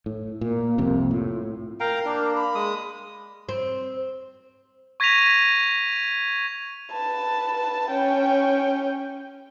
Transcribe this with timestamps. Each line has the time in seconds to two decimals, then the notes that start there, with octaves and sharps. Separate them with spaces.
0.06 A2
0.41 A#2 A#3
0.78 C2 F2 C3
1.11 A2 F4
1.80 A#4 F5 G5 A#5
2.05 A#3 D4
2.35 B5
2.55 G#3 D#6
3.49 C4
5.00 C#6 G#6 A#6 B6 D#7 F7
6.93 B4 A5
7.91 C#4 G5